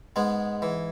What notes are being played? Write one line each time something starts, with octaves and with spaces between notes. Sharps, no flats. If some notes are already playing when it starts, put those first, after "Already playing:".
G#2 G#3 B3
E3